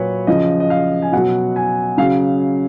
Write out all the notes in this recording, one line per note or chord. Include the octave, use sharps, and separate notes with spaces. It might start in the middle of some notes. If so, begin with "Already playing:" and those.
Already playing: A#2 F#3 B4 C#5
C#3 F3 D#5
D#5
F5
G#5
B2 F#3 F#5
G#5
C#3 F#3 F5